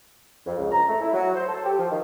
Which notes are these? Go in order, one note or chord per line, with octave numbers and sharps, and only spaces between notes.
F2
C#2
A#5
A3
E4
F#3
C5
A4
G4
F3
D#3